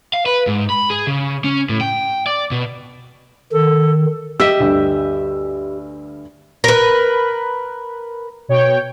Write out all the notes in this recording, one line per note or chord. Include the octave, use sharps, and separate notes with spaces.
F5
B4
G#2
B5
G#4
C#3
C#4
A2
G5
D5
B2
D#3 A4
G4 D#5 E5 E6
D2 G2
A#4 B4
B2 C#5 G5